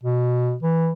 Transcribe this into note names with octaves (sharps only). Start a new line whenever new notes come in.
B2
E3